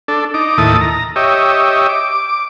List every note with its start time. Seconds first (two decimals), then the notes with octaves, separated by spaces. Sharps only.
0.08 D4 A4
0.34 D#4 D6
0.58 D#2 A2 E4 A5 D#6
0.81 A#5
1.16 G4 C#5 D#5 E5
1.89 D6